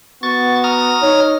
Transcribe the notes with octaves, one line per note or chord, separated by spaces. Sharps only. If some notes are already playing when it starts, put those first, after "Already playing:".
B3 F#4 C#6 A6
A#5 D#6 F6
D#4 C#5